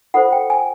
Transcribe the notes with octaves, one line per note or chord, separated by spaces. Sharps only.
F4 A4 C5 F#5
G5
G#5